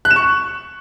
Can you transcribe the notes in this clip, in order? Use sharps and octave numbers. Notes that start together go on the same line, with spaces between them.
F#6
E7
C#6